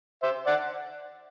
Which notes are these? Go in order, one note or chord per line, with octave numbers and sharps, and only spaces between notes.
C5 E5
D5 F#5